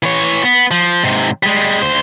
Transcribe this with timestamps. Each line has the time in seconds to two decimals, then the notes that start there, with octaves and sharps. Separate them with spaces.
0.03 E3 C#5
0.44 B3
0.71 F3
1.04 G#2 C3
1.43 G3 G#3
1.82 D2 C5